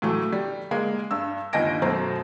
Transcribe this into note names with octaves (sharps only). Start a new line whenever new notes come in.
A2 E3 F#3 A3
G3
G#3 A#3
G2 E6
G1 D#2 D#5 G#5 A#6 D7
F#2 B2 A3 C5 A#5